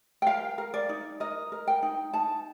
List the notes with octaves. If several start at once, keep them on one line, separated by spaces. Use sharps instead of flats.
G5
A#4 F5
A#4
D5
D#4
A#4 D#5
A#4
G5
D#4
D#4 A5